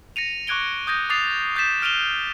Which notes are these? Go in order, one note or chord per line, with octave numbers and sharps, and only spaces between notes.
A#6 C#7 D#7 F7
C#6 D6 F#6 G#6 D7 G7
D#6 G6 G#6 A#6 D#7
D6 D#6 A6 C7 F7
D#6 G6 A6 B6 E7
F6 D7 D#7 F7 G7